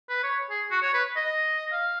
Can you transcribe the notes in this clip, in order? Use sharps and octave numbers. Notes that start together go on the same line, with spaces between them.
B4
C#5
G#4
F#4
C#5
B4
D#5
F5